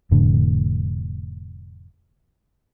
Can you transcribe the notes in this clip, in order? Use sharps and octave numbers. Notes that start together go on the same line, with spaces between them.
F1 A2 D3